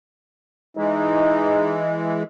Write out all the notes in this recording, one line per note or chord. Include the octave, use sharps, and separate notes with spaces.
E3 G#3 D#4